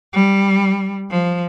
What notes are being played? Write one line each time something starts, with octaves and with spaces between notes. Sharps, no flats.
G3
F3